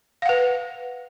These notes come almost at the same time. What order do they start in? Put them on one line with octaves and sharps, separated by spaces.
F5 F#5 B4